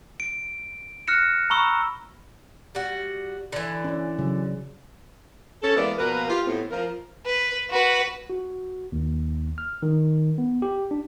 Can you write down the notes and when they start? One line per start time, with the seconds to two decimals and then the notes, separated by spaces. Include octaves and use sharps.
0.20 D7
1.07 F6 F#6 A#6 C#7 E7
1.50 A#5 B5 C#6 E6 G7
2.75 G3 F#4
3.52 D3 E3
3.84 C#4 D5
4.18 C#3 F#3
5.63 C#4 A4
5.76 E3 G#3 A#3 B3 A#4 D5
5.99 B2 F3 A#3 A#4 B4
6.29 F4 G4
6.46 A2 B3 C4
6.71 F3 A#4
7.26 B4
7.71 F#4 B4
8.30 F#4
8.92 D#2
9.58 F6
9.83 D#3
10.38 B3
10.62 G4
10.91 D4